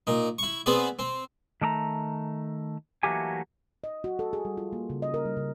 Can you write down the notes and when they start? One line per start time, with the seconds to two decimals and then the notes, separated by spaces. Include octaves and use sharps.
0.07 A#2 D#4
0.39 E4 C#6
0.66 B3 C4 G#4 B4 D5
0.99 C4
1.61 D#3 A3 D5 A#5
3.03 E3 F#3 A3 A#3 G4 G#5
3.84 D#5
4.04 F#4
4.19 A4
4.33 G#4
4.45 G3
4.57 F4
4.73 A#3
4.90 C#3
5.02 D#5
5.14 A#4
5.25 G3
5.37 C#3